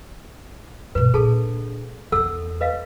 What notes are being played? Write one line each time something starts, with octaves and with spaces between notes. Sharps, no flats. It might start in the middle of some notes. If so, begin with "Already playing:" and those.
G2 B2 B4
A#2 D4 G#4 A4 A5
E2 D#4 A4 F#5 E6
B4 D#5 F5